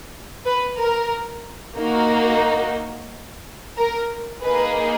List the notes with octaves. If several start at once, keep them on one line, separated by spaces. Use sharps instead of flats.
B4
A#4
A#3 D#4 F#4 A#4
A#4
A#3 D#4 G#4 B4